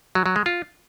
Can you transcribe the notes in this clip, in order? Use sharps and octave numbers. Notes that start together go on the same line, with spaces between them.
F#3
F#3
G#3
F4